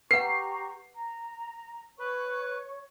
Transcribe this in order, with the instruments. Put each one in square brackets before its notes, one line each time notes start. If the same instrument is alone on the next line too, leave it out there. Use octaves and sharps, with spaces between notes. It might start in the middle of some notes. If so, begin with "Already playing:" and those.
[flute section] G4 A#5 C#6 [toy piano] B4 F#5 [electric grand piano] C7
[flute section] A#5
[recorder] B4 [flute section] C#5 C#6